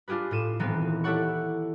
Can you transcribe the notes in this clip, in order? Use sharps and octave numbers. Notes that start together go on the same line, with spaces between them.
D4 F4 G4 G#4 B4
A2 F4 D#7 E7
D#1 E3 B3 C4 D#4
E4 G4 A4 C#5 F#5 C#6